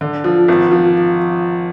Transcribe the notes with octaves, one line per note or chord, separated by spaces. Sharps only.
D3
F3
G#1
F3